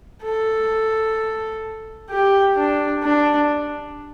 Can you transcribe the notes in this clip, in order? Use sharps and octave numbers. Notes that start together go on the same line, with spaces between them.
A4
G4
D4
D4